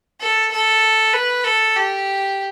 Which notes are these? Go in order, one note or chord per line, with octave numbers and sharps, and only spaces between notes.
A4
A4
B4
A4
G4